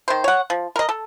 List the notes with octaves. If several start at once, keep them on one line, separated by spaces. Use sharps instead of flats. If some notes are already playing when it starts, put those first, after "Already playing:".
D#3 C5
C#5 F#5
F3
A#4 D#5
A4